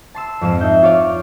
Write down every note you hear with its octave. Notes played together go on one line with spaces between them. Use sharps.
A5 C6 E6
F2 G#2 C4 E7
D#4 E5 G6
F4 C#5 D5 F5